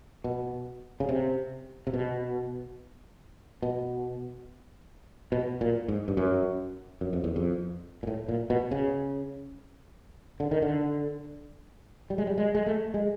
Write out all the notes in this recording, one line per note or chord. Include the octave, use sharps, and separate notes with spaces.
B2
C#3
C3
C3
B2
B2
B2
A#2
G#2
G2
F#2
F#2
F2
E2
F2
A#2
A2
A#2
B2
C#3
D3
D#3
D3
G3
G#3
G3
G#3
G#3
A3
G#3